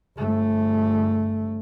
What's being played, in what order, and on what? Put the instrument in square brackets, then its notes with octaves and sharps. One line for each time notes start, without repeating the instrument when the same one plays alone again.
[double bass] G1 A3